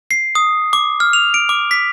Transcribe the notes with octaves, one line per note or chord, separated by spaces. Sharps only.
C7
D#6
D6
F6
F7
D7
D6
B6